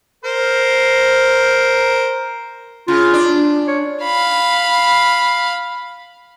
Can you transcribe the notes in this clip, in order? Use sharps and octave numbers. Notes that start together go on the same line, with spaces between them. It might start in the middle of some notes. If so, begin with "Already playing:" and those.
A#4 C5
C#3 F4
D4
C#5
F5 B5